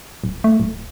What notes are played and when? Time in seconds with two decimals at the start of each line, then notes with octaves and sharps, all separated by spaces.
0.24 D1
0.44 A3
0.60 D1